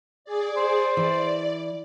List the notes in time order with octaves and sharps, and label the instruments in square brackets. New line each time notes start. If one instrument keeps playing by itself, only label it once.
[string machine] G#4 D5
[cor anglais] C5
[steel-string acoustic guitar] E3 [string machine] D5